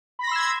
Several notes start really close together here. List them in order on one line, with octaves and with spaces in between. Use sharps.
B5 A#6 C6 E6 G#6